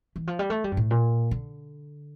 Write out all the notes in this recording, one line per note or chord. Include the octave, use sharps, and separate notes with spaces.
E3
F3
G3
A3
G3
G2
A2
A#2
D3